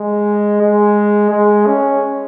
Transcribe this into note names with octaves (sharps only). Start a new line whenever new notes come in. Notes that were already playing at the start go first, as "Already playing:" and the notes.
Already playing: G#3
G#3
G#3
C#4